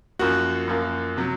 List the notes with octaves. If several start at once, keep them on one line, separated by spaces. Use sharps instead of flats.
F#2 F3 A#3 F#4
F#2 F3 A#3
C3 F#3